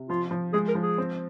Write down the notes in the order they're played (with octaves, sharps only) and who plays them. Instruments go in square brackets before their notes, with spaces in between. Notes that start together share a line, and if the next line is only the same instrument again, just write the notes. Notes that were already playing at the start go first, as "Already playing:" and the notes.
Already playing: [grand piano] C3
[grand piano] F3 [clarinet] F4
[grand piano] F3
[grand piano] G#3 [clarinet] G#4
[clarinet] A#4
[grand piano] F3
[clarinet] G#4
[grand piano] C4